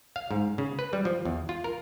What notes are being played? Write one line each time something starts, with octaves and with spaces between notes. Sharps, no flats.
F5
G#2
C#3
B4
G3
F3
E2
F4
A#4